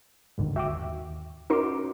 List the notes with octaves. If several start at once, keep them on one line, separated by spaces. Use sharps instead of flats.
G1 D#2 G#2 D3 D#3
F#4 E5 G5 D6
D#2
C#4 D#4 F#4 A#4 C6 D6